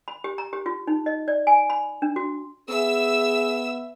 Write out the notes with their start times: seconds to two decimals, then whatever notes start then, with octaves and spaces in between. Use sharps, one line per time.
0.08 B5
0.24 G4
0.38 A#5
0.53 G4
0.66 F4
0.87 D#4
1.06 D#5
1.28 D5
1.47 G#5
1.70 B5
2.02 D4
2.16 F#4
2.70 B3 G#4 E5 E6